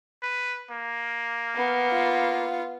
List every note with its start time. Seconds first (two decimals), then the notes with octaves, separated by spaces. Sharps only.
0.22 B4
0.71 A#3
1.55 B3
1.92 F4